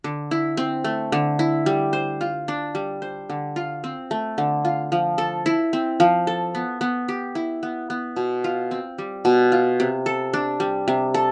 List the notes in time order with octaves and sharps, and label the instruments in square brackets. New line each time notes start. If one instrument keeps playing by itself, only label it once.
[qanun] D3
E4
C4
A3
D3
E4
G3
C5
F4
D4
G3
C5
D3
F4
C4
A3
D3
F4
F3
A4
E4
C4
F3
A4
B3
B3
G4
E4
B3
B3
B2
F4
C4
G3
B2
F4
C3
A4
D4
G3
C3
A4